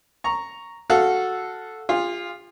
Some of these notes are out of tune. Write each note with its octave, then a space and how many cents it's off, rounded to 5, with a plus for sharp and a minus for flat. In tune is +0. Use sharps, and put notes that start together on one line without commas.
A#5 +0 C#6 +0
F#4 -5 A4 -5 F5 -15
F4 +0 G#4 -45